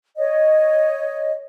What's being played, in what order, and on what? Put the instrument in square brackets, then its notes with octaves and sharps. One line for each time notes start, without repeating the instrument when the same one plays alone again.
[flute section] C#5 D#5